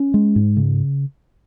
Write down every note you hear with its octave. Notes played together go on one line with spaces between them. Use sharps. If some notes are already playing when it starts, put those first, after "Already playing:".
Already playing: C#4
G#3
G#2
C#3